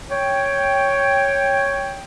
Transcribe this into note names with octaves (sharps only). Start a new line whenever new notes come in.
C#5 G5